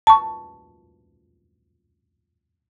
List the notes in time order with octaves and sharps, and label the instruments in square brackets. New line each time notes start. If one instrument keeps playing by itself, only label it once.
[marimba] A5 C#6